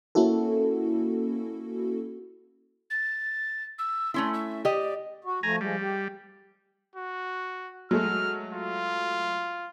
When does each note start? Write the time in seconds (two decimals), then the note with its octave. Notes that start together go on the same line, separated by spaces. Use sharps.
0.15 A#3 C#4 E4 F#4 A4
2.90 A6
3.78 E6
4.14 A3 C#4 E4 C6
4.33 E5
4.65 G4 D5 D#5
5.24 F#4
5.43 F3 A3 G#5 A#5
5.61 F3 G3 G#3
5.81 G4
6.95 F#4
7.91 F#3 G#3 A3 F6
8.53 F4